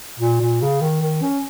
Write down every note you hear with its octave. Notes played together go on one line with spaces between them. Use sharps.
A#2
A#2
C#3
D#3
D#3
C#4